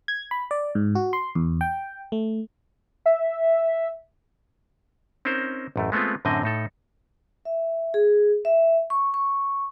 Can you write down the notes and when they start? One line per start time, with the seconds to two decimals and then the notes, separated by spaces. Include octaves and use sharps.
0.08 G#6
0.31 B5
0.51 D5
0.75 G#2
0.95 F#4
1.13 C6
1.35 E2
1.61 G5
2.12 A3
3.06 E5
5.25 C4 C#4 D#4 A#4 C5
5.76 A1 F#2 A3
5.92 G#3 A3 B3 C4 F4
6.25 F#2 A2 D3 C4 D#5 G#5
6.43 A2 D#4 A4
7.45 E5
7.94 G#4
8.45 E5
8.90 C#6
9.14 C#6